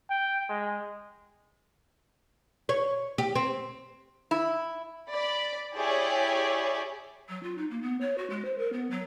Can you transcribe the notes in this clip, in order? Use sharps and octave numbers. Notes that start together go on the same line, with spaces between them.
G5
G#3
C#5
G4
C4
E4
D5 B5
E4 G4 G#4 C#5 D5
F#3
F4
D#4
A#3
B3
C#5
F#4
G#3
C5
A#4
B3
F#3